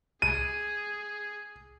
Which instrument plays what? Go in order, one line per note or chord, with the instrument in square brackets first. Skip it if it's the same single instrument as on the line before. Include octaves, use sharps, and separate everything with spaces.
[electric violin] G#4 [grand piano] D#7